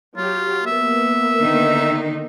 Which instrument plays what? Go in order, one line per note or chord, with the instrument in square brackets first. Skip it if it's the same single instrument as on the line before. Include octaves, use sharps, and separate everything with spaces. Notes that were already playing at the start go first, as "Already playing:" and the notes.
[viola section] F#3 G4 [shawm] F4
[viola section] A#3 B3 [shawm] E5
[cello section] D3 D#3 D#4